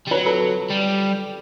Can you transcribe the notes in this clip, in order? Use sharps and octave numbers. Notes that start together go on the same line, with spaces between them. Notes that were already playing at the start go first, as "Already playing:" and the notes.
G3
F#3 B4 C#5
A4 B4
G3